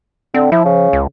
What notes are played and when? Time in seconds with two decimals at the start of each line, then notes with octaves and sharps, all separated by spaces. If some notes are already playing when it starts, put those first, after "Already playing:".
0.34 D3 C4
0.52 F3 E4
0.65 C#3
0.93 C#2